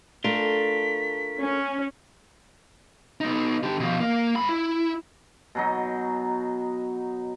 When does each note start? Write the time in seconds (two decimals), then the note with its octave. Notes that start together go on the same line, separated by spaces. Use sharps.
0.24 A3 D4 F4 A#4 B6
1.42 C#4
3.21 B3 D#4
3.63 D3 G4
3.80 B2 F3
4.00 A#3
4.36 G#2 B5
4.49 E4
5.55 B2 F#3 D#4